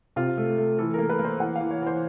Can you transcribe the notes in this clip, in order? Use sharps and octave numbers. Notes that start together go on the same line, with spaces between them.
C3 F4
A3
A3
E3 A4
A#3 A#4
B4
A#3
C5
E3 F#5
E3 F5
C#5
E3 C5